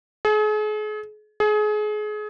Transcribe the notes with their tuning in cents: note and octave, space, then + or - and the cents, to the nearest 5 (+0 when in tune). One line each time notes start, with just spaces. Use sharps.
G#4 +40
G#4 +30